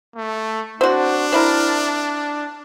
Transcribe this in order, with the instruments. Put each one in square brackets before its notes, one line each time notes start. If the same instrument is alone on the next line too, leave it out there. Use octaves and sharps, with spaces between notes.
[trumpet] A3
[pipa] C4 F#4 [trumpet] D4
[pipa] C4 E4 A#4